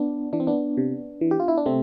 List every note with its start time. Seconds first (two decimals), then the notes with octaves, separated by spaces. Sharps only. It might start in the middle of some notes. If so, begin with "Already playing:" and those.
Already playing: B3 D4
0.33 E3 D4
0.40 C4
0.47 B3 D4
0.77 C3
1.21 E3
1.31 G4
1.40 F4
1.48 E4
1.57 D4
1.66 C3 A3 C4